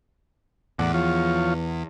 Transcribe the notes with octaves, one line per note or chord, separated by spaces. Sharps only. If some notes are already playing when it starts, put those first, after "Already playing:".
E2 A2 D5 F#5
F3 F4 C#5